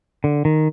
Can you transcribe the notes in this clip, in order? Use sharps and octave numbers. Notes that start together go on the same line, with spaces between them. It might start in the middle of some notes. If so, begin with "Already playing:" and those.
D3
D#3